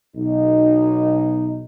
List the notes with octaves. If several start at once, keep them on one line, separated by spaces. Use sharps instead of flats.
B1 D#4